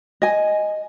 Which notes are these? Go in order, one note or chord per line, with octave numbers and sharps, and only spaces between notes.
D#5 G#5